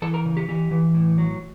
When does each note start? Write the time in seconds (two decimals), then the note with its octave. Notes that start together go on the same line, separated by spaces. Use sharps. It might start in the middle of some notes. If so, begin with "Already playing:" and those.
0.02 E3 A4
0.14 A#4
0.25 C#3
0.37 G4
0.48 E3 G4
0.71 E3
0.94 A2
1.18 F#3